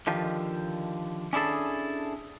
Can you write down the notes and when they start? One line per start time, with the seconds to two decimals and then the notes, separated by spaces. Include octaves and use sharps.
0.07 D3 D#3 F3 G4
1.33 C#4 D4 E4 G#4 A4